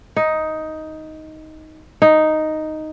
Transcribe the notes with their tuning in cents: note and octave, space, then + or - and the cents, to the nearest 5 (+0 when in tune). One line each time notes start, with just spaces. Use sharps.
D#4 +10
D#4 +0